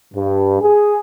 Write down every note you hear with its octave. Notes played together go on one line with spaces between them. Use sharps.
G2
G#4